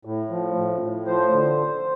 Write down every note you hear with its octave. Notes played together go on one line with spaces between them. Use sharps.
A2
F3
A2
A2
F3 C5
D3